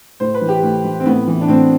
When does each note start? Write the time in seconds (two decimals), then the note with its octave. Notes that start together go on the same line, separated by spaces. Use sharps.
0.20 A2 C5
0.34 B4
0.41 E3
0.49 G4
0.63 A2
0.84 E3
1.00 C4
1.06 A2 B3
1.27 E3
1.41 D4
1.48 A2 C4